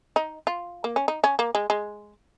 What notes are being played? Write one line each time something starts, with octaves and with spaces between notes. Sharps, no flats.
D#4
F4
A#3
C#4
D#4
C#4
A#3
G#3
G#3